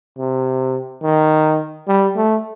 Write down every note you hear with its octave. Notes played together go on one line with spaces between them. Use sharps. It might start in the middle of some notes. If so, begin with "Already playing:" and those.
C3
D#3
G3
A3